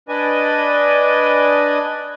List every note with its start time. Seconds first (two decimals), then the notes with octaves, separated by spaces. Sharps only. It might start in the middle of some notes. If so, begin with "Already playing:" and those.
0.09 D4 B4 D5 D#5 G#5